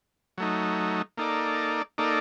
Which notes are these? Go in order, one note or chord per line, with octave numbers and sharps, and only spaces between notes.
F#3 A3 D#4
A#3 D#4 A4 D5
A#3 D#4 A4 D5